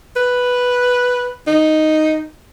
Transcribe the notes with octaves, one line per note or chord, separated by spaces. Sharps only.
B4
D#4